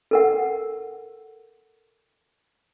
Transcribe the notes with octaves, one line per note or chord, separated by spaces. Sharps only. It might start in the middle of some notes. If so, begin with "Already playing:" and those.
A4 A#4 F#5